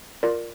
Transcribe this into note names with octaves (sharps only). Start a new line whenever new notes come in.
F4 A#4 D5